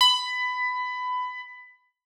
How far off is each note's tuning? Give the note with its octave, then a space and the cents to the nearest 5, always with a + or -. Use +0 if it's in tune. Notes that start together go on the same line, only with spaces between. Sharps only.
B5 +20